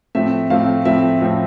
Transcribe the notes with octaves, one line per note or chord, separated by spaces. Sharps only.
A2 F3 A3 C4 E5
A2 F3 A3 C4 F5
A2 F3 A3 C4 E5
A2 F3 A3 C4